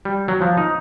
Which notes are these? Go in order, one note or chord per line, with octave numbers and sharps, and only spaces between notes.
G3
F#3
F3
D#4